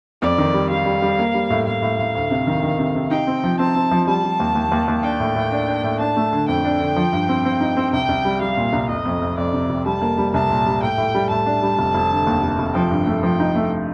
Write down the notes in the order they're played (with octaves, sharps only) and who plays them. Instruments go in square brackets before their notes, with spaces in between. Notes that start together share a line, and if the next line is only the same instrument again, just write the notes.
[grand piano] F2 [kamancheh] D5
[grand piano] D#3
G3
[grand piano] G3 [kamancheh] F5
[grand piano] G3
G3
A#3
G3
A2
[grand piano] A2 [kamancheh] F5
[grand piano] A2
A2
D2
C3
D#3
D#3
C3
C3
[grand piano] D#4 [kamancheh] G5
[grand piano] C4
F3
[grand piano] C4 [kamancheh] A5
[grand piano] C4
F3
[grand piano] G3 [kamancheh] A5
[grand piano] G3
D#2
D#2
D#2
D#2
[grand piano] D4 [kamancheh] G5
[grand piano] A2
A2
D4
D4
A2
[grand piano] D4 [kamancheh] A5
[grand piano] A3
D3
[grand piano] F2 [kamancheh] G5
[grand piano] D4
D3
F3
G2
C4
C4
D#4
C4
[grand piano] C2 [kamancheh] G5
[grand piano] C2
G3
[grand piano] G3 [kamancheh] F5
[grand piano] A#2
C2
[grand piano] F1 [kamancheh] D#5
[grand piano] F2
F2
[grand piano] F2 [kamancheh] D5
[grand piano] C3
F1
[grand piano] G3 [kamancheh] A5
[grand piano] A#3
G3
[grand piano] C2 [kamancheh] A5
[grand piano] A#2
G3
[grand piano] A2 [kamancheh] G5
[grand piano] A2
G3
[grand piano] A2 [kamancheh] A5
[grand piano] D4
G3
F1
F1
D3
D#2
F1
F1
[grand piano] F3 [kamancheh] G5
[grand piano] G2
A3
[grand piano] F3 [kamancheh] G5
[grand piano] D#4
A3